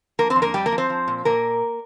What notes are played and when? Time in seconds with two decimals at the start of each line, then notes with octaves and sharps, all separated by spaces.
0.19 F3 A#3 A#4
0.30 C4 C5
0.36 F2
0.42 A#3 A#4
0.54 F2 G3 G4
0.66 A#3 A#4
0.72 F3
0.78 C4 C5
0.90 F3
1.08 A#2
1.25 A#2 A#3 A#4